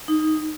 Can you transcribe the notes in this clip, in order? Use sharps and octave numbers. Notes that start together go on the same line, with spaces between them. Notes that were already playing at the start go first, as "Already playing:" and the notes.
D#4